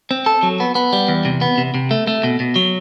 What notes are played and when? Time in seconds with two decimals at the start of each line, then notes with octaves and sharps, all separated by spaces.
0.11 C4
0.26 A4
0.43 F#3
0.60 B3
0.75 B3
0.93 G3
1.08 E2
1.25 C3
1.41 B3
1.58 C3
1.74 C3
1.91 A3
2.07 A3
2.24 B2
2.40 B2
2.56 F#3